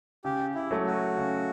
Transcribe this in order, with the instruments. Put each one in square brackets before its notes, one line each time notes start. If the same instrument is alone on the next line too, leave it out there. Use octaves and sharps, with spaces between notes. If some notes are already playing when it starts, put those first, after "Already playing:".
[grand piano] C#3 [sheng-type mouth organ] G4
[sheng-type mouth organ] E4
[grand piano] F#3 A3
[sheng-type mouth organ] F#4
[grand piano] C#3